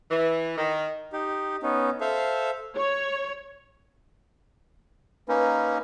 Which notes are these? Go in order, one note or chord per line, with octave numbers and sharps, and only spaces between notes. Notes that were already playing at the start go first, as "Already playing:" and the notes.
E3
D#3
D#4 G4
B3 C#4 D#4
A4 C5 E5 F5
C#5
A#3 C#4 D#4 B4